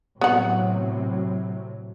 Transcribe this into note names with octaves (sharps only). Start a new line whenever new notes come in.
A2 C3 F#3 B3 F#5